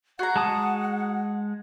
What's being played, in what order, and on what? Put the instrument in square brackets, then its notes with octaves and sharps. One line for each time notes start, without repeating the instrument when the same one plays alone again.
[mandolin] F#4 G#4 A#5 [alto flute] F#5
[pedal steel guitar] G#3 A5 D#6